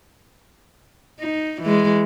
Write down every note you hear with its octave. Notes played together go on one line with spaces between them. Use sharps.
D#4
E3 G#3